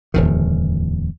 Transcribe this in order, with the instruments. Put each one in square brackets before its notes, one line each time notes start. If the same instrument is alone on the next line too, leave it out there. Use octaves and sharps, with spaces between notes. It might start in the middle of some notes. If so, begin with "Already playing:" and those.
[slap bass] D1 E2 D#3